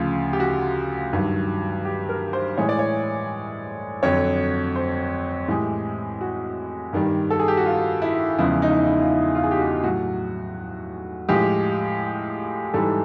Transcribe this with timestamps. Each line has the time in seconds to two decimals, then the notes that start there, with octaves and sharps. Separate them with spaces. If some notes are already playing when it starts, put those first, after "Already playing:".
Already playing: D2 C#3 F3 F4
0.33 G4
0.40 F#4
1.12 G2 D#3 F#3
1.85 G4
2.09 A#4
2.33 C5
2.58 A2 E3 G#3 C#5
2.69 D5
2.79 C#5
4.03 F2 D3 F#3 C#5
4.76 C5
5.48 A2 E3 G#3 G4
6.21 F#4
6.93 G2 D#3 G3
7.30 A4
7.40 G#4
7.48 G4
7.57 F#4
7.66 F4
8.02 E4
8.38 E2 C#3 F3 G#3 E4
8.62 D#4
8.70 E4
8.77 D#4
8.87 E4
9.00 F4
9.11 E4
9.35 F4
9.43 G#4
9.51 G4
9.59 F#4
9.83 A2 F#3 F#4
11.29 A2 F3 G#3 G4
12.74 G#2 E3 G3 A4